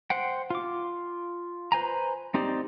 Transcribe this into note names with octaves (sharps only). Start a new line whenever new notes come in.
C5 F#5 G5
F4 D6
B4 C5 G#5 A#5
C4 D#4 G4 C5 D5